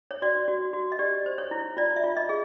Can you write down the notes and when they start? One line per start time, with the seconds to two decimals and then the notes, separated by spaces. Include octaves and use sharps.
0.11 C#5
0.22 F#4 D5
0.48 F#4
0.73 F#4
0.92 D#5
0.99 G4 D5
1.26 C5
1.38 C#5
1.51 E4
1.77 F4 D5
1.96 E5
2.04 F4
2.17 D#5
2.29 G#4